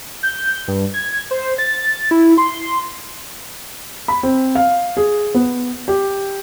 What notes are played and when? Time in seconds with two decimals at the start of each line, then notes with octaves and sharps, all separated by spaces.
0.23 G6
0.68 G2
0.94 G#6
1.31 C5
1.58 A6
2.11 E4
2.38 C6
4.08 B5
4.23 C4
4.55 F5
4.97 G#4
5.35 B3
5.88 G4